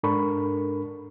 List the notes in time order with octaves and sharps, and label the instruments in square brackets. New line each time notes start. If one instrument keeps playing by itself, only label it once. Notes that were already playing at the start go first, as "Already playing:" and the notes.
[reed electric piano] G#2 D4 A4 A#4 B5 C#6